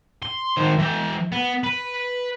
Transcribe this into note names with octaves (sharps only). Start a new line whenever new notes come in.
C6
D#3 C5
E3 G5
B3
B4